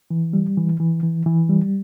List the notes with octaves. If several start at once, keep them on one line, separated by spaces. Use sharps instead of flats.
E3
G3
E3
E3
E3
E3
G3